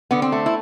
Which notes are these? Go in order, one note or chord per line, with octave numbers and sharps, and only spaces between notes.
D3 B3
C4
A3
E4